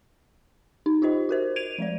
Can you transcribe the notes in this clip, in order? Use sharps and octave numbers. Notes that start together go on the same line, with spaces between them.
D#4
F4 G4 C5 D#5
F#4 A#4 C5
G#6 D7 D#7 F7
F3 G#3 D5